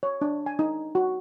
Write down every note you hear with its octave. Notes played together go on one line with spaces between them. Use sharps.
C#5
D4
G#5
D#4
F#4